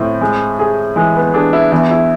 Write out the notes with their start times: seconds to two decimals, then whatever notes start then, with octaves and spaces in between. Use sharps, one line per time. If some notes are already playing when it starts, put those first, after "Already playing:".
Already playing: A2 C4
0.21 G#3
0.59 G#4
0.96 E3 G#3
1.15 B3
1.34 D4 G#4
1.53 E4
1.72 E2 E4
1.91 E4